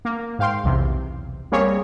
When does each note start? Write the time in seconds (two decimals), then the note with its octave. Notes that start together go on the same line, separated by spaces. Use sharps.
0.05 A#3
0.39 G#2 F5 G5 C6
0.64 B1 E2 C3
1.52 G3 A#3 C4 G#4 C#5